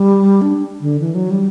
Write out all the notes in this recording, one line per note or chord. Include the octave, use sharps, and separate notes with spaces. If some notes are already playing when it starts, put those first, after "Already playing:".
Already playing: G3
D4
D3
E3
F#3
G3